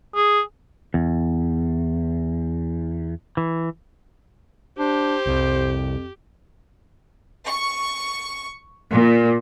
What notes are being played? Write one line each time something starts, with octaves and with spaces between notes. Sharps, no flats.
G#4
E2
E3
D4 G4 C5
C2 F2
C#6
A#2